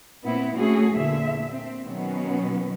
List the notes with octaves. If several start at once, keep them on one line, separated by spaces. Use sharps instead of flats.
A#2 B3 C4 E4
A3 C#4 F#4 G#4
E2 A#2 D3 E5
C4
B2 D#3 F#3 B3 C#4